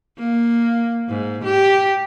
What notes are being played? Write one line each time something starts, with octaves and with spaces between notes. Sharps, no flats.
A#3
G#2
G4